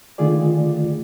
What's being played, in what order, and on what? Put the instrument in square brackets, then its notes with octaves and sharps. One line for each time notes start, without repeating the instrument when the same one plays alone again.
[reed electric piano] D3 D#3 A3 F4 G#4 D5